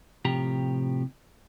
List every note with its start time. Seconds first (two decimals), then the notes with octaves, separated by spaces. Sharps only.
0.25 A2 C3 F3 G4 A#5